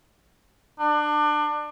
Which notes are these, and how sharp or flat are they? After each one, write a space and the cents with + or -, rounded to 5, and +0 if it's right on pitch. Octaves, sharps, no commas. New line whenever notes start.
D4 +25